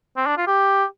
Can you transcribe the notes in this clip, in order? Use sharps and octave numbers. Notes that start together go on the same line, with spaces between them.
C4
D4
F4
G4